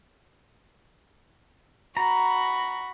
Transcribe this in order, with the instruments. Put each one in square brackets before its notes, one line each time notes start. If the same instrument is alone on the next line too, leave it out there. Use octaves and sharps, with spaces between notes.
[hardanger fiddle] F#4 B5 [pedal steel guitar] A#5